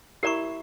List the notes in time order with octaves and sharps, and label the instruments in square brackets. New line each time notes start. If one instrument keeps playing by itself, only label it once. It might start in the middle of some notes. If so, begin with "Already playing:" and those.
[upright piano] E4 [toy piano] G4 A#4 D5 A#5 C#6